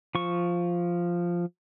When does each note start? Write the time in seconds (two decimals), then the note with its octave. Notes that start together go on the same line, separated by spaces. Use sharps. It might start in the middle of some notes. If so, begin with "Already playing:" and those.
0.15 F3 C#6